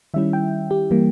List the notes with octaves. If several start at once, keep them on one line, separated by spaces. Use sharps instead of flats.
D#3 G3 C#4 E4 E5
G5
G4
E3 G3 A#3